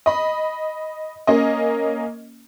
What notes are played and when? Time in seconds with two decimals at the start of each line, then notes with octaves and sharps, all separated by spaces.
0.06 D#5 B5
1.27 A#3 C#4 D#5